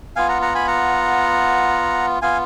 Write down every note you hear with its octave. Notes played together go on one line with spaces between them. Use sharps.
B3 F4 F5 G#5
F#5 A#5
F#5 A#5
G#5 B5
F#5 A#5
B3 F4 F5 G#5